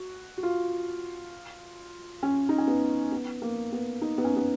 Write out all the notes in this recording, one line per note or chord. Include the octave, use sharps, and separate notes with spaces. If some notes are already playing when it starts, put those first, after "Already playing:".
Already playing: F#4
F#4
F4
C#4
D#4
C#4
B3
B3
A#3
B3
D#4
B3
C#4
B3